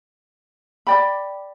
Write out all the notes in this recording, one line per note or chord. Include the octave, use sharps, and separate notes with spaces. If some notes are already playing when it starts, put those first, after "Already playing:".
G4 D5 G5 B5